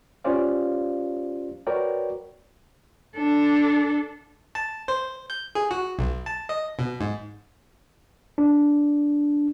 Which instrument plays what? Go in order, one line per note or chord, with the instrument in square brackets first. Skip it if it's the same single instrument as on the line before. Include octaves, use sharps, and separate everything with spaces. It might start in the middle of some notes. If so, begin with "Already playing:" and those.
[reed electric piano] C#4 F4 G4 C5 D5 F5
F#4 A#4 B4 C#5 D5 G5
[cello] D4 A4
[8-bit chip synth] A5
C5
G6
G#4
F#4
B1
A5
D#5
B2
G#2
[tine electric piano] D4